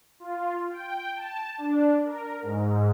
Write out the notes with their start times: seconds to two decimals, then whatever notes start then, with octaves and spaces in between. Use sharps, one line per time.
0.20 F4
0.70 G5
1.16 A5
1.58 D4
2.05 A#4
2.42 G#2